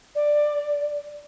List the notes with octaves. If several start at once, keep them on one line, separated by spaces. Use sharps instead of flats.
D5